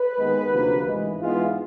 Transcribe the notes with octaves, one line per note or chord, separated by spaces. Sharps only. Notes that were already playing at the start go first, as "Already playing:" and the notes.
Already playing: B4
D#2 D#3 G#3 B3
D2 C3 F3 A#3
A1 G#2 E3 G#3
G#2 E3 G#3 B3 F4